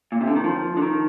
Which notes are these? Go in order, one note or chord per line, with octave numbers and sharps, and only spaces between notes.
A#2
C3
D3
D#3
F3
D3
D#3